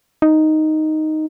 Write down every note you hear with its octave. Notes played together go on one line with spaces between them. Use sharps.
D#4